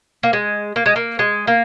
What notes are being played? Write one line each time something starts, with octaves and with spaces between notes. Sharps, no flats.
A#3
G#3
A#3
G#3
A#3
G#3
A#3